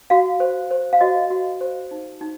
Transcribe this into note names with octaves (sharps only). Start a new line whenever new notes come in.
F#4 F5
C5
C5
F5
F#4 D#5
F#4
C5
D#4
D#4